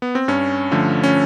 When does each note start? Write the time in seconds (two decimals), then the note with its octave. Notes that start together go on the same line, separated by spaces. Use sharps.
0.02 B3
0.15 C4
0.28 G2 C#4
0.71 D3 F3 A3
1.04 C#4